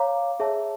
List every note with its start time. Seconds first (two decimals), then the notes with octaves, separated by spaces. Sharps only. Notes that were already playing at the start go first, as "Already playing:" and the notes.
Already playing: C#5 F5 A#5 D6
0.40 G#4 C#5 E5 A5